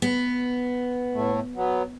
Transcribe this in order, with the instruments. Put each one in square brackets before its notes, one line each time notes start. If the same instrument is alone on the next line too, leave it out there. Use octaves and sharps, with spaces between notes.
[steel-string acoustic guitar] B3
[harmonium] A2 A3
F#3 B3